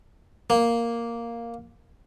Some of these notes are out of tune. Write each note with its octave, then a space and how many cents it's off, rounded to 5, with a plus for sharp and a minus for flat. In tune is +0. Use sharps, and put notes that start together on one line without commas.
A#3 +0